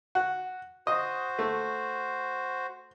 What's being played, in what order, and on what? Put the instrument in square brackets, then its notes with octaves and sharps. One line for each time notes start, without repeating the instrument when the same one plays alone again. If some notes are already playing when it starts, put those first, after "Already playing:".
[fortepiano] F#4
[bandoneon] F#4 C5 [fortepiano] D#5
[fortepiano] A3